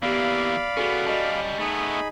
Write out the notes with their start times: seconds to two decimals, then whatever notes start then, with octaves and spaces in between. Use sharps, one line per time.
0.02 E3 A#3 B3 G4 D5 F5 B5
0.77 B3 C#4 F#4 G#4 A4
1.06 G3 C#4 C#5 D#5 A5
1.59 A3 B3 D#4 G#4 B5